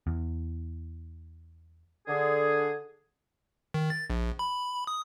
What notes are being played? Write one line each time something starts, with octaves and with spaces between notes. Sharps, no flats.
E2
D3 G#4
D#3
A6
A#1
B5
D#6